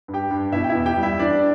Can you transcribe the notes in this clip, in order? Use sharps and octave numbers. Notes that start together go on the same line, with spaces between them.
G2
G4 G5
G2
B2 E4 E5
G5
E4 E5
E2
G4 G5
G3
E4 E5
E3 D4 D5